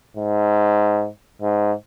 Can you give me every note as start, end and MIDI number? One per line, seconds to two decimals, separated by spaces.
0.17 1.08 44
1.42 1.72 44